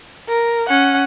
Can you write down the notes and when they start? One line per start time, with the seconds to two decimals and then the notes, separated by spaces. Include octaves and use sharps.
0.28 A#4
0.69 C#4 F#5